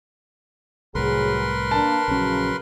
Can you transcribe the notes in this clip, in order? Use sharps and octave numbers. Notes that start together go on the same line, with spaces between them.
C2 A2 F#3 G#4 A#4 B4 C6
A#3 D4 A5
A#1 C#3 F#3 C#4